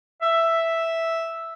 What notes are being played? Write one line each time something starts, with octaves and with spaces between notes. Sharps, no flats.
E5